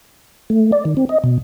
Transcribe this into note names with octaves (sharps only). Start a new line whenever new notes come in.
A3
D5
D#3
C4
D#5
B2